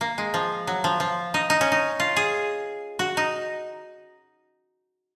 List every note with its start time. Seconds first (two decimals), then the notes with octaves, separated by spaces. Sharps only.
0.01 A#3
0.18 G#3
0.34 F3
0.67 F#3
0.84 F3
1.00 F3
1.34 D#4
1.50 D#4
1.61 C#4
1.72 D#4
2.00 F4
2.16 G#4
2.99 F#4
3.17 D#4